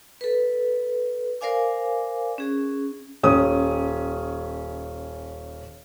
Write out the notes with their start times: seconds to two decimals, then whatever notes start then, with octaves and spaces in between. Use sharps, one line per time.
0.21 A4 B4
1.41 A#4 C5 D5 F5 G#5 D6
2.38 C#4 G#4
3.23 D#1 C#4 D#6